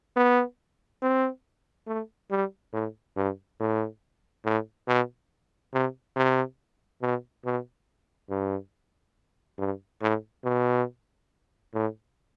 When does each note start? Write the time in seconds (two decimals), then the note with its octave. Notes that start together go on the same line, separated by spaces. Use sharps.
0.16 B3
1.02 C4
1.87 A3
2.31 G3
2.73 A2
3.16 G2
3.60 A2
4.45 A2
4.88 B2
5.73 C3
6.16 C3
7.02 B2
7.45 B2
8.30 G2
9.58 G2
10.01 A2
10.44 B2
11.73 A2